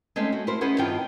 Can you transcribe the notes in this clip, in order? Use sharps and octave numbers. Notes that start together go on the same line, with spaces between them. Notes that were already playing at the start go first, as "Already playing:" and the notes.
G#3 A3 C4 C#4 D#4
F#4
E4 A#4 C5
B3 C#4 E4 G#4 C5
G2 D#3 C4 F4 G5